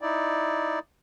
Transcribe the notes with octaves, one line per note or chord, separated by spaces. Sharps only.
D#4 E4 D5